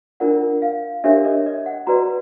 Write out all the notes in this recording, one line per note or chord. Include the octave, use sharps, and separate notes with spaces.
D4 F4 A#4 D5 F#5
F5
D4 G4 A#4 C#5 E5
D#5
D#5
F#5
F#4 B4 D5 A#5